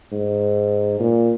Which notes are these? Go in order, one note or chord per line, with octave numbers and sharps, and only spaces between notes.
G#2
A#2